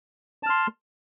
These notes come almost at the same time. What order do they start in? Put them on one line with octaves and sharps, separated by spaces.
A5 F6 C6